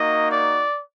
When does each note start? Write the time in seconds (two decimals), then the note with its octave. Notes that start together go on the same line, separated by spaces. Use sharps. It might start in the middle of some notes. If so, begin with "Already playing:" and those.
Already playing: A#3 D#4 F#4 D#5
0.32 D5